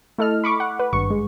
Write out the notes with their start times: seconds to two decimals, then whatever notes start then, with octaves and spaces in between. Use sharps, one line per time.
0.18 A3 E4 A4 D#5 F6
0.44 B5 C#6 D6
0.60 F#5
0.79 B4
0.93 G#1 G2 C#6
1.10 G#3